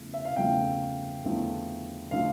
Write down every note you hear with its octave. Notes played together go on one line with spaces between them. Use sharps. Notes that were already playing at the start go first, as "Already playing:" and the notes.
Already playing: E2 C#3 F3 A3
E5
F5
E2 C#3 F3 A3 G5
E2 D3 F3 A3
D3 F3 A3 F5